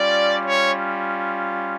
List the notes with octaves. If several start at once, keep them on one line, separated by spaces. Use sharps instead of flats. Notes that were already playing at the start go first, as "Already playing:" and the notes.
Already playing: G3 C#4 F4 D5
C#5